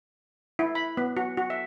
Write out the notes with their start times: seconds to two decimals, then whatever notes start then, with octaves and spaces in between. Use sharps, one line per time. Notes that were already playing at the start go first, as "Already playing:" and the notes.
0.59 E4
0.75 B5
0.97 B3
1.17 F#4
1.37 F#4
1.50 E5